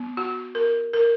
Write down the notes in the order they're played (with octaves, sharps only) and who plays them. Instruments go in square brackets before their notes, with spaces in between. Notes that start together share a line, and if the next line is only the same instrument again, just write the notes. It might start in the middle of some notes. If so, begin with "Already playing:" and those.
Already playing: [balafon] B3
F#4
A#4
A#4